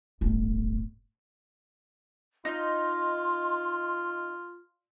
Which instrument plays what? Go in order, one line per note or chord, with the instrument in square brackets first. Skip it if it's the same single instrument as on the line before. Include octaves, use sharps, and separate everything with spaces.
[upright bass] D1 G1
[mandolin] D#4 [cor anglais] F4 [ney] C6